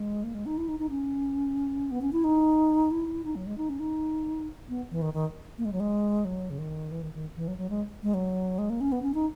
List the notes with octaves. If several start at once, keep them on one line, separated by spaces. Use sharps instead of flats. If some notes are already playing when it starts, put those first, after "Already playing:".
Already playing: G#3
A#3
G#3
D#4
E4
D#4
D#4
C#4
B3
C#4
E4
D#4
E4
D#4
F#3
G#3
D#4
C#4
D#4
B3
E3
D#3
D#3
A#3
G#3
F#3
G#3
F#3
C#3
D#3
E3
D#3
D#3
E3
F#3
F#3
G#3
G#3
F#3
G#3
A#3
C#4
B3
C#4
D#4